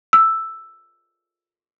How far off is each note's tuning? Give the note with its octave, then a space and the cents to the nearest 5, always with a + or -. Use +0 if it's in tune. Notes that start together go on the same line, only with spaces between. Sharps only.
E6 +5